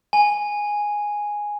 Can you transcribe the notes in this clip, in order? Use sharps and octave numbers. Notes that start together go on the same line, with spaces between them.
G#5